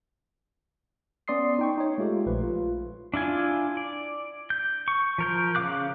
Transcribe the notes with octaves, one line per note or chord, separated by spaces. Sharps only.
B3 C#4 D5 C6 D#6 C7
D#4 G5 C#6
D#4 C#5
G#3 A3 F4 G4 A4
A#1 F3 B4
F4
D4 E4 F4 G#5
D5
G6
C#6
F3 A#4 G6
C#3 G3 F5 D6 F#6